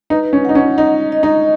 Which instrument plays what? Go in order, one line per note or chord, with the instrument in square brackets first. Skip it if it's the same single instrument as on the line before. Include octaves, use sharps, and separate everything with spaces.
[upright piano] D#4 [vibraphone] B4
[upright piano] C#4
[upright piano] D#4 [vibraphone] F#5
[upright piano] C#4
[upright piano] D#4 [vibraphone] D#5
[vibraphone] D#5
[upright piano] D#4